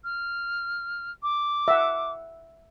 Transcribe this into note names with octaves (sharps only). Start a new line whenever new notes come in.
F6
D6
E5 F#5